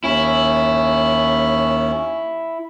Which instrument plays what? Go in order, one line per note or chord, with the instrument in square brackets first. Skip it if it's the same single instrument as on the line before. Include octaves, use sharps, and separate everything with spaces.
[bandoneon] D#2 C#4 [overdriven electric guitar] E4